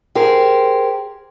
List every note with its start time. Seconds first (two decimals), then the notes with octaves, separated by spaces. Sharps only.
0.15 G4 G#4 A#4 C5